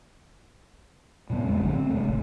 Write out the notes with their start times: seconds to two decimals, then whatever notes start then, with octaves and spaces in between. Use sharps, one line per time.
1.30 A#2 C#3 G3 B3
1.44 F2 G#3 A3 C#4
1.61 A1 G2 D3 F#3
1.74 C4
1.89 C3 E3 G#3 A3
2.03 D1 G#1